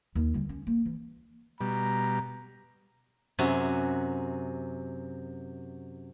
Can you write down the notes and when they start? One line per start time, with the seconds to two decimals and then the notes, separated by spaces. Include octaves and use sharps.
0.15 D#2
0.34 D3 G3
0.49 C#4
0.67 A#3
0.85 E3
1.61 B2 G3 A#5
3.39 F#2 C3 F#4 G#5